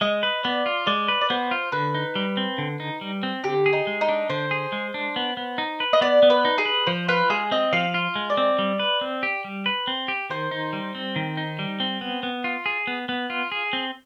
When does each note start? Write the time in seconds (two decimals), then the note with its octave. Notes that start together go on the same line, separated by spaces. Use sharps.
0.01 G#3 D#5
0.23 B4
0.44 B3 D5
0.66 F4
0.87 G#3 D5
1.08 B4
1.21 D5
1.30 B3 C5
1.51 F4
1.72 D3 B4
1.95 D#4
2.15 G3
2.37 C4
2.58 D3
2.80 D#4
3.01 G3
3.23 C4
3.44 D3 G4
3.66 G#4
3.73 D#4
3.87 G#3
4.01 D#4
4.09 D4
4.30 D3 C5
4.51 G#4
4.72 G#3
4.94 D4
5.16 B3
5.37 B3
5.58 D#4
5.80 B4
5.93 D#5
6.01 B3 D5
6.23 B3
6.30 B4
6.45 D#4
6.58 G#4
6.65 B4
6.87 F3 C5
7.08 F4 B4
7.30 G#3 G#4
7.51 C4 D#5
7.73 F3 F5
7.94 F4
8.16 G#3
8.30 D5
8.37 C4
8.59 G3
8.79 B4
9.01 C4
9.23 G4
9.44 G3
9.66 B4
9.87 C4
10.08 G4
10.30 D#3 C5
10.51 D#4
10.73 G3
10.95 C4
11.16 D#3
11.37 D#4
11.59 G3
11.80 C4
12.01 B3
12.23 B3
12.44 F4
12.66 G#4
12.87 B3
13.09 B3
13.30 F4
13.52 G#4
13.73 C4